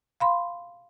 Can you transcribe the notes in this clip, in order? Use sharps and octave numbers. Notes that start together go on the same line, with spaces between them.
F5 B5 C6